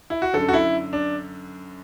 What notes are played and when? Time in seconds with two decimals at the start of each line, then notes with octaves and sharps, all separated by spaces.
0.10 E4
0.22 F#4
0.33 F#2 D3 A4
0.48 F#4
0.54 E4
0.93 D4